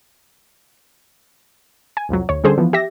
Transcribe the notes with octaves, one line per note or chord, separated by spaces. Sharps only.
G#5
C2 F2 F#3
D2 C#5
D3 G3 C#4 G#4 A4 C5
E3 F3 B3
G4 E5 A#6